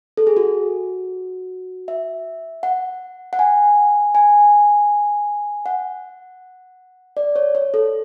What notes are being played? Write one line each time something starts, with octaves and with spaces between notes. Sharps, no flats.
A4
G#4
F#4
E5
F#5
F#5
G#5
G#5
F#5
D5
C#5
C#5
A4